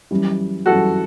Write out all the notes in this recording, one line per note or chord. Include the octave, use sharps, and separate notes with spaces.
F#2 E3 G3
F#2 E3 G3 F#4 A4